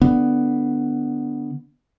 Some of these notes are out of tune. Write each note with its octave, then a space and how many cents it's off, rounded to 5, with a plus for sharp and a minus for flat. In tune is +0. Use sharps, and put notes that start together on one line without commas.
D3 +0 B3 +0